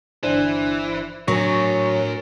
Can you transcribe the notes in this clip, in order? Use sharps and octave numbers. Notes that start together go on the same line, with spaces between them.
G1 E3 D4 C5
A2 F#3 D4 A#4 G#5 C#6